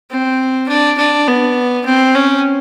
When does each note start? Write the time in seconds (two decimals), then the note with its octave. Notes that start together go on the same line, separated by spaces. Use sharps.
0.10 C4
0.68 D4
0.98 D4
1.27 B3
1.85 C4
2.15 C#4